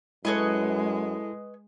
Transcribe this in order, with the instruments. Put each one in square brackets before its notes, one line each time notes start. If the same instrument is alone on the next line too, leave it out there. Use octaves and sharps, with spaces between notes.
[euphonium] F#2 [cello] G#3 [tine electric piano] E4 A4 [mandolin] B4 C#5 D#5